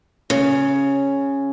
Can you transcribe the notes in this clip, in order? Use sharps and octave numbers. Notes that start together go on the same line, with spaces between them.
C#3